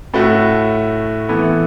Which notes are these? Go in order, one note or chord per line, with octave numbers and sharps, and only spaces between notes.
A2 A3 F#4
E3 B3 E4 A4